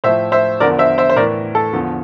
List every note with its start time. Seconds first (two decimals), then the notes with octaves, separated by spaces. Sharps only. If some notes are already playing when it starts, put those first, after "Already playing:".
0.04 A2 F3 C5 E5
0.32 C5 E5
0.60 E2 D3 F3 A#4 D5
0.79 C5 E5
0.98 C5 E5
1.09 C5
1.16 A2 E3 A#4 D5
1.55 A4
1.73 E2 D3 F3